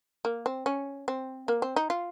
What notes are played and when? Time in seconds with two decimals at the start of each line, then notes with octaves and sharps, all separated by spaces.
0.25 A#3
0.46 C4
0.66 C#4
1.08 C4
1.48 A#3
1.62 C4
1.76 D#4
1.90 F4